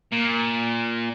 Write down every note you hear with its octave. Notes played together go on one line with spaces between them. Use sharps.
A#2